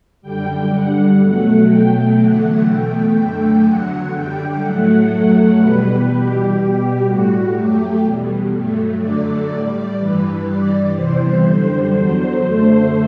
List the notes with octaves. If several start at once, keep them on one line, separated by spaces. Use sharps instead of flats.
F#2 D3 G3 G5
G2 D3 G3 F#5
B2 F#3 A3 F#5
B2 F#3 A3 G5
E2 D3 F#3 A3 F#5
E2 B2 A3 G5
F#2 D3 A3 G5
E2 D3 F#3 F#5
F#2 D3 G3 G5
A2 F#3 A3 F#5
F#2 F#3 A3 F#5
E2 B2 G3 B4
E2 B2 G3 G4
B2 G3 G4
A2 G3 F#4
F#2 F#3 A3 G4
E2 B2 G3
G2 F#3 A3
F#2 D3 F#3 A3 D5
A2 G3 D5
G2 E3 G3 B4
G2 E3 G3 D5
E2 C3 E3 G3 C5
F#2 D3 G3
E2 D3 F#3
F#2 D3 A3 C5